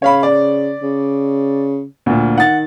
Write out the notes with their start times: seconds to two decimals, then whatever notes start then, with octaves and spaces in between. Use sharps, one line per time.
0.02 C#3 C#5 F5 B5
0.23 D5
0.82 C#3
2.06 D2 A#2
2.38 D#3 F#5 A6